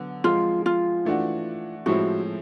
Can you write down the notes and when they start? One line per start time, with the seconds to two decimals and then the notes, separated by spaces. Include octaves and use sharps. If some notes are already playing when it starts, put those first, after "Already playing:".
Already playing: D3 F#3 B3
0.24 F3 G#3 C4 F4
0.66 F4
1.05 E3 A3 D4 F#4
1.86 A2 F3 G#3 C4 E4 F#4